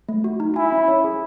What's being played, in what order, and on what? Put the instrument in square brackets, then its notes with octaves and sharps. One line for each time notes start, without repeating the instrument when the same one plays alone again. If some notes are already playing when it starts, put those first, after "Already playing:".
[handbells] A3
F#4
D#4
[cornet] E4 [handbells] G#5
[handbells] C#4
C#5
G#4